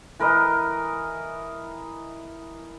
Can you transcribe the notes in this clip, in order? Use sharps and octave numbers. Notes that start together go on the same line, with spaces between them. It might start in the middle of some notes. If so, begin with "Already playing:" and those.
E3 A#4 B4 D#5